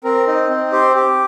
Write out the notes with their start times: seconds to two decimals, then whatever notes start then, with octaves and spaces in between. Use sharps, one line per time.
0.04 C4 A#4
0.27 D#4
0.50 C4
0.72 G4 C5
0.95 G4